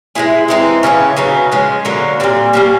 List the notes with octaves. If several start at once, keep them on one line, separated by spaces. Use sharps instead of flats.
G#3 B3 E4 G#4
E3 G#3 C4 D#4
C#3 E3 A3 C#4
C#3 F#3 B3 D#4
F3 G#3 C#4
D3 F#3 A#3
A#2 G3 C4
G3 A#3 C#4